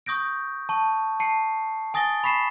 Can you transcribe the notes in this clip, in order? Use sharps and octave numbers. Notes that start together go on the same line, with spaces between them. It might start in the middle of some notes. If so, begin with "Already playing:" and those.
C#6 D#6 G6 A#6 D7
A5 C#6
A5 C7 C#7
G#5 D#6 A6 A#6 G7
B5 C#6 B6 C7 E7